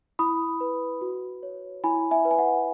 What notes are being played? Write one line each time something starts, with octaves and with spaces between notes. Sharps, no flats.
E4 B5 D#6
B4
F#4
C#5
E4 G#5 B5
E5 G#5
B4
G#5
F#5